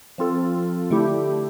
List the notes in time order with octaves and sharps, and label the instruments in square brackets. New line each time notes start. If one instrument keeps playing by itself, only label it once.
[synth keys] F3 C4 F4 A4
D3 A3 E4 G4